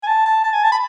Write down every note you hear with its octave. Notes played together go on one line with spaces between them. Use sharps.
G#5
A5
A5
A5
G#5
A5
B5